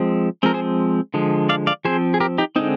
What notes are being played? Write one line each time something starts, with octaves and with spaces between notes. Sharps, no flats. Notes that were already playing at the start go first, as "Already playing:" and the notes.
Already playing: F3 G#3 C4
F3 G#3 C4 A#4
G#4 C5
D3 F3 G#3
D5 F5
D5 F5
F3 C4 G#4 C5
G#4
G4 A#4
D#4 G4
D3 G#3 C4 D#4